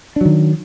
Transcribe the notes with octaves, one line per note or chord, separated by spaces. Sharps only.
D#3 F#3 D4